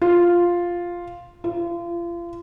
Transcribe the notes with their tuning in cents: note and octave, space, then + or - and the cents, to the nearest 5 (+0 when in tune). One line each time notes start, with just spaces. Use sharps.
F4 +0
F4 -35